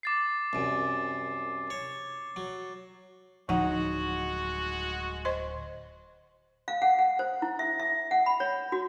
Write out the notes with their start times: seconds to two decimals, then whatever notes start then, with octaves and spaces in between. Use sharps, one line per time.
0.03 D6 A6 C7
0.53 C2 F#2
1.70 C#5
2.36 F#3
3.49 D1 F3 G#3 D#4 F#4 F#5
5.25 C5 D#5 C6
6.68 F5
6.82 F#5
6.99 F#5
7.19 C5
7.42 E4
7.59 E5
7.79 E5
8.11 F#5
8.26 B5
8.40 C#5
8.72 F#4